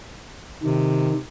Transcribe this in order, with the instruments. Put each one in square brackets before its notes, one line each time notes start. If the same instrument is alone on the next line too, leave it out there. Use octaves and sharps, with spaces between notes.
[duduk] C3 [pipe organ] D#3